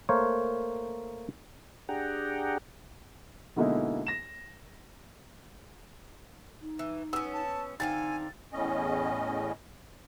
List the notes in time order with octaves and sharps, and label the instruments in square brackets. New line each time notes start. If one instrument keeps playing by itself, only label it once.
[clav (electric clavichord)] A3 A#3 A#4 C5 C#5
[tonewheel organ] D4 G4 G#4 F#5 G5 A#5
[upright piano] B2 D3 G#3 A#3 D#4 E4
A#6 E7
[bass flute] D#4
[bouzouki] E3
[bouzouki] B3 C#4 [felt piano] E6
[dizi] A5
[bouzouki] D3 C4 F4 [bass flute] D#4 [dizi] G#5 [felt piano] A6
[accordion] E2 A2 C#4 D#5